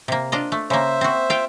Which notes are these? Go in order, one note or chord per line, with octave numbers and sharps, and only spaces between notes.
C3 A#3
D4 F4 D#5
A3
C#3 A#3 C5 E5
C4 F#4
F4 G5